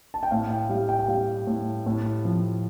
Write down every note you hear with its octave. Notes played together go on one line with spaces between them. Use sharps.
A5
G5
A2 F5
G5
G3 F5
G5
G5
G3 F5
A2
A2
F3